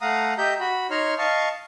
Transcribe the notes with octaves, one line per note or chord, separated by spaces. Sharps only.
A3 F5 F#5 A#5 D#6
G4 D#5 E5 A#5 G6
F#4 B5
D#4 C#5 A#5 C6 F6
D#5 F5 A5 C#6